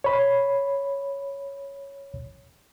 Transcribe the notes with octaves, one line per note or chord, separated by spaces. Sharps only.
C#5 B5